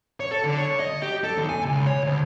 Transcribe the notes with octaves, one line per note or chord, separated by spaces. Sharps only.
C#5
A4
D3
C#5
D#5
G4
A4
D#2
G#5
C#2
C#5
D2